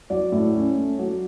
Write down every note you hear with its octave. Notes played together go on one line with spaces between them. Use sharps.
F#3 D5
A2
C#4
A3
F#3